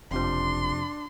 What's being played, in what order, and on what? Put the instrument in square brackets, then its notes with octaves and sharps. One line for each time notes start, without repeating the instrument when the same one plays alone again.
[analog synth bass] F#1 [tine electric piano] F2 C3 F3 [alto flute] D4 [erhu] C6